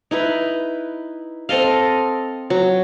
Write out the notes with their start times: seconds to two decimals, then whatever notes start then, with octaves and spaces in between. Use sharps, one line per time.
0.11 D#4 E4 B4
1.49 C4 A4 D#5 F5
2.50 F#3